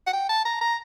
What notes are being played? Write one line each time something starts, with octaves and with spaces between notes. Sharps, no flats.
F#5
G5
A5
A#5
A#5